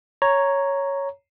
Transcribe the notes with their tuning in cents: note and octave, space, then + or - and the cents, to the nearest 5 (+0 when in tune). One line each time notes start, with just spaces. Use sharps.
C#5 +0 A#5 +0